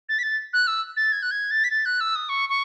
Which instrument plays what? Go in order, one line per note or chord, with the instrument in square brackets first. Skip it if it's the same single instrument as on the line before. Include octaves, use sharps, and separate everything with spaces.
[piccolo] A6
B6
A6
F#6
E6
A6
G#6
F#6
G#6
A6
B6
A6
F#6
E6
D#6
C#6
C#6